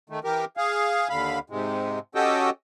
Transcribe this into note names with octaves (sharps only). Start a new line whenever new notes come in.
D#3 A3
E3 G4 A#4
G#4 F5
D#2 D3 F5 B5
G#2 C3 G#3
C#4 F#4 G4 A4 D#5 G5